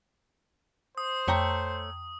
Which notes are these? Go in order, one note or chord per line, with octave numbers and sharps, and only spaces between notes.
C5 D#6
F2 A3 C#5 G5 A#5